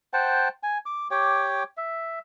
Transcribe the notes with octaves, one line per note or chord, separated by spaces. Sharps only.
C5 F#5 G5 A5
G#5
D6
G4 C#5 G5 D6
E5